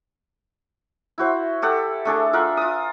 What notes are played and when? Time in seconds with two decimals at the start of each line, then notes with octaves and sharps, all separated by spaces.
1.18 E4 F#4 C5
1.62 G4 A4 F#5
2.05 A3 D4 G#4 A4
2.33 F4 A#4 E5 F#5
2.57 F4 D#6